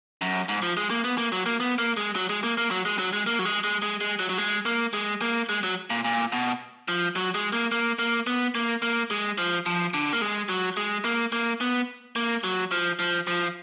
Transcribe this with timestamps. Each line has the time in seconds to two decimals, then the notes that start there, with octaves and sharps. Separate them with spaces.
0.21 F#2
0.49 G#2
0.62 F3
0.77 G#3
0.90 A#3
1.04 B3
1.18 A#3
1.32 F#3
1.46 A#3
1.60 B3
1.78 A#3
1.97 G#3
2.15 F#3
2.29 G#3
2.43 A#3
2.57 A#3
2.71 F#3
2.85 G#3
2.99 F#3
3.13 G#3
3.27 A#3
3.39 F#3
3.45 G#3
3.64 G#3
3.82 G#3
4.01 G#3
4.19 F#3
4.29 F#3
4.38 G#3
4.66 A#3
4.93 G#3
5.21 A#3
5.49 G#3
5.63 F#3
5.90 A#2
6.05 A#2
6.32 B2
6.88 F3
7.16 F#3
7.35 G#3
7.53 A#3
7.72 A#3
7.99 A#3
8.27 B3
8.55 A#3
8.82 A#3
9.10 G#3
9.38 F3
9.66 F3
9.94 D3
10.13 A#3
10.21 G#3
10.49 F#3
10.77 G#3
11.05 A#3
11.32 A#3
11.61 B3
12.16 A#3
12.44 F#3
12.71 F3
12.99 F3
13.27 F3